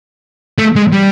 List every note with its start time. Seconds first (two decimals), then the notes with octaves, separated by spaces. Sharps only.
0.58 A3
0.76 G#3
0.93 G3